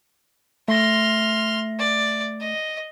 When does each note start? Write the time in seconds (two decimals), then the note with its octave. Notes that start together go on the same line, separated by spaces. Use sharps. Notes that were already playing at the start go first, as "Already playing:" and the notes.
0.68 A3 E5 C6 F6 A#6
1.79 D5
2.40 D#5